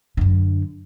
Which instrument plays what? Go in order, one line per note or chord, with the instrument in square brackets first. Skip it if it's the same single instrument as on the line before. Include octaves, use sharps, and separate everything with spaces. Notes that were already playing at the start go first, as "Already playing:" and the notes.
[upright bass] F#2 D3